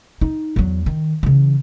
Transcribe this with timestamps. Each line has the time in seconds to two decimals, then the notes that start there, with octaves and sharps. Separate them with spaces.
0.21 D#4
0.56 E2 F#3
0.86 D#3
1.23 C#3 E3